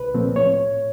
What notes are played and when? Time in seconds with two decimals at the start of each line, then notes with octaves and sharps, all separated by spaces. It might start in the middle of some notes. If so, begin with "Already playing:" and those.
Already playing: C2 B4
0.14 A#2 F3 A3 C4
0.36 A2 C#5